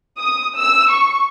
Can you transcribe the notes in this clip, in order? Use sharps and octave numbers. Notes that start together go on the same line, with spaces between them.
D#6
E6
C#6